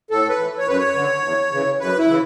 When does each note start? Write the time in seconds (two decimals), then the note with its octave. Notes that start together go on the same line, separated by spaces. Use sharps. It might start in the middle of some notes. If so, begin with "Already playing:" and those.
0.10 A2 A4
0.29 B4
0.38 E3
0.58 C#5
0.67 F#2 B4
0.78 C#5
0.95 D3
1.23 E2
1.52 C#3 E3
1.80 F#2 B4
1.99 E4
2.08 C#3 E3